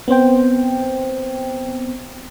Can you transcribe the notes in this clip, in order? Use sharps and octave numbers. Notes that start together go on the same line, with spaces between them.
B3 C4 C5 G5